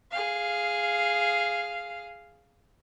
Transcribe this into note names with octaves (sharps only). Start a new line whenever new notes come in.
G#4 F5